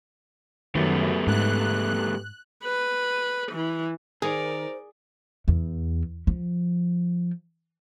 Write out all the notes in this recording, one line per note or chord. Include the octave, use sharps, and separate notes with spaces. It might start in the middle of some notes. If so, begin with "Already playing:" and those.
F#2 D#3 G3 A3 B3
G#2 F#6
B4
E3
D#3 G#4 A#4 C5 D5
E2
F3